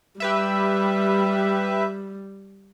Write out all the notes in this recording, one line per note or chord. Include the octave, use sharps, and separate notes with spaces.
G3 G4 B4 E5